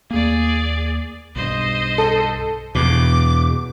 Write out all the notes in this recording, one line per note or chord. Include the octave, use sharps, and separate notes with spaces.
D#2 A#3 G#4 D5
B1 G2 C5 D#5
A4
E2 B2 D6